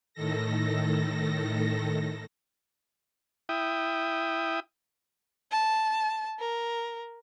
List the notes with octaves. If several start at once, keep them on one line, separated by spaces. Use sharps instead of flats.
A2 D#3 A4 A#6
E4 G5 D#6
A5
A#4